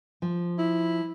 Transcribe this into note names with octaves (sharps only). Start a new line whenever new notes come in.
F3
E4